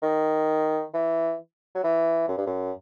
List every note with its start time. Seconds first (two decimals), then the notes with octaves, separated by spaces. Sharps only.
0.02 D#3
0.94 E3
1.75 F#3
1.84 E3
2.28 F#2
2.38 G2
2.46 F#2